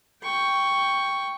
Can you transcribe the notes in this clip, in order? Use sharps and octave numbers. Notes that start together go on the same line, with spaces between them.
G5 C#6